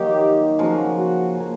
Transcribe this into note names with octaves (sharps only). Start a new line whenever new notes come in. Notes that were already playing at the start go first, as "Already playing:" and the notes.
Already playing: D#3 F#3 A#3 G4
C#3 F3 A#3 F#4
F#4
C#3 F3 A#3